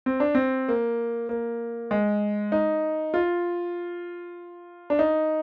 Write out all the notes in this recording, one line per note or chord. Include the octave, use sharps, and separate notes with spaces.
C4
D4
C4
A#3
A#3
G#3
D#4
F4
D4
D#4